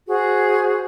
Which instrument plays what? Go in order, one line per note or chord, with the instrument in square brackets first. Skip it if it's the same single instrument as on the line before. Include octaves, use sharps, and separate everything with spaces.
[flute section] F#4 G#4 C5